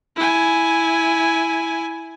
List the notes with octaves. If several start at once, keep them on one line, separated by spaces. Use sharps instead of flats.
E4 G#5